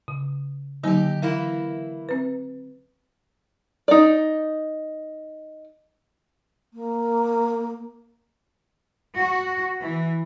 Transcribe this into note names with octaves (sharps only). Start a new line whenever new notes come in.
C#3
D3 F#3 A#3 D#4 G4
E3 A#3 E4 E5 F5
C4 B4
D#4 D5
A#3
F#4
E3